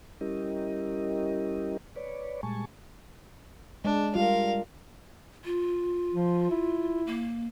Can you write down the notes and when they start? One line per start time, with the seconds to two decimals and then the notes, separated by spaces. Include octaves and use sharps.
0.21 G3 C#4 E4 G4 A#4 D#5
1.96 B4 C#5 D5
2.43 A#2 G3 G#3 G#5 A5 C#6
3.85 G#3 D4
4.15 G3 F4 A#4 F5
5.45 F4
6.14 F3
6.50 E4
7.07 A#3